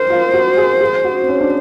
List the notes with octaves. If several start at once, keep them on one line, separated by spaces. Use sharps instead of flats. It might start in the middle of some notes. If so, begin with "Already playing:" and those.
Already playing: A#4 C5
F4
F#4
G#4
G#4
F#4
C4
C#4
D4